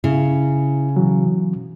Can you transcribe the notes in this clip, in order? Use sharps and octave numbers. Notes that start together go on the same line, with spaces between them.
C#3 E4
B2 E3 F#3